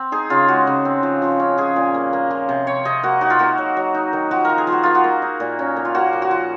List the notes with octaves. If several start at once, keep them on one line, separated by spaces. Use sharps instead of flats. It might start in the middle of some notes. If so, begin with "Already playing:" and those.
Already playing: C4
D#4 G#4
C#3 F4
G#3 F#4
C#3
C4
F3
F3
C#4
F3 G#4
A#2
A#3
A#3
F3
C3
C3 C#5
C3 D#5
A#3 F#4
D#4 F#4
F4
A#3 F#4
F#3
F#3
D#4
D#3
F3 F#4
F3 A#4
G#4
F3
F#4
A#3 F4
F#4
A#3
D#4
A#2
C#4
A#3
F4
A#3 F#4
F3
F#4
F3